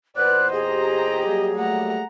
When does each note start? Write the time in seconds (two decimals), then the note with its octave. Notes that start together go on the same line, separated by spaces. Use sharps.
0.17 E2 A#2 B3 B4 C5 D5 F#6
0.53 G4 G#4 D#5 A#5
1.26 F#3 G3 A#3
1.56 A3 F#5 A#5